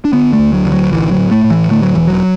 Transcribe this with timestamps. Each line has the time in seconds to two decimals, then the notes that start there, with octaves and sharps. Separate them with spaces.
0.05 D4
0.13 D3 B3
0.33 A3
0.39 D2
0.53 F#3
0.66 D3
0.72 F#3
0.92 A1 E3
1.11 F#3
1.18 A2
1.31 A3
1.44 A2
1.51 E3
1.70 D3 A3
1.82 F#3
1.95 E1 E3
2.07 F#3